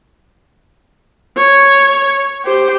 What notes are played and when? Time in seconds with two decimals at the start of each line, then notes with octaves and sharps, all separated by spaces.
1.37 C#5
2.45 G4 C5